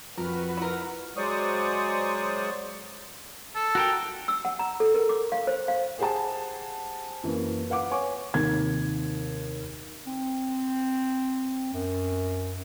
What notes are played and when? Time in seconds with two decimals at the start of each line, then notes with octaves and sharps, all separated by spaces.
0.18 F2 F#4 A#4 B4
0.57 E4 A#4
1.17 F#3 G#3 C5 D5 C#6 D#6
3.56 A4
3.75 F#4 A#4 G5
4.28 E6
4.45 F#5
4.59 A#5
4.80 A4
4.94 A#4
5.09 D6
5.32 F5
5.47 C5
5.68 F5
5.98 G4 G#4 C5 F#5 G#5 A5
7.23 F#2 E3 A#3
7.70 B4 F5 F#5 D6
7.91 C#5 G#5 C#6 D6
8.34 D#2 C3 G#6
10.07 C4
11.74 F#2